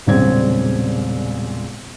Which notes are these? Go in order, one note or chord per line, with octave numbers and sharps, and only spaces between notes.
E1 A#1 C#3 G3 C4 G#6